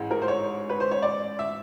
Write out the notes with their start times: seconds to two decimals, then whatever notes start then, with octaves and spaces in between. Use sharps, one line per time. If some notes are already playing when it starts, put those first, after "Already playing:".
Already playing: A1 G#2 E3 G#3
0.11 A#4
0.22 C5
0.28 C#5
0.69 B4
0.80 C5
0.91 C#5
1.02 D5
1.39 E5